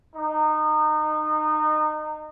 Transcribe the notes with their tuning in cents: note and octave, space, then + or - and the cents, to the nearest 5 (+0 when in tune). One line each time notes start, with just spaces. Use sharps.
D#4 -25